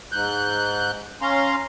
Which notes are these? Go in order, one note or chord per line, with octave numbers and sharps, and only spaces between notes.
G#2 F#6 G6
C#4 F5 A#5 C6